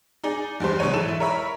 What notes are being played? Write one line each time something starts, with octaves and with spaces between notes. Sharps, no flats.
D#4 G#4 D5
E2 G2 G3 C5
C#2 B2 F#3 D4 C#5 D#7
G#2 E3 A4 E7
E4
A#4 C#5 E5 B5